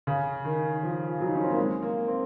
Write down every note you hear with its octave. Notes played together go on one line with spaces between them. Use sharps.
C#3
D#3
F3
F#3
D#4
C#4
C4
A#3
G#3
A#3
C4